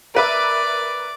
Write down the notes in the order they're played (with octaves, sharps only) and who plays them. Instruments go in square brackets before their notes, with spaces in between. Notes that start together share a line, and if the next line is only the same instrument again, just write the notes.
[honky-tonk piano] A#4 B4 E5 [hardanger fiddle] D5 D6